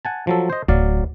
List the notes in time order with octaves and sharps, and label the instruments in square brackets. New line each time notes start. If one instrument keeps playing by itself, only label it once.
[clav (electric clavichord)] F#5 G#5 A5
F3 F#3 A4
C5 D#5
[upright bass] D1 [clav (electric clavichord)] F#3 D5 F5